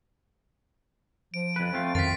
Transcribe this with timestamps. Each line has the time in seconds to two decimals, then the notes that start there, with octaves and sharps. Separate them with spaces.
1.34 F3 D7
1.56 F2 B4
1.73 A3 C4 F4
1.95 F#2 D#3 F4 A6 B6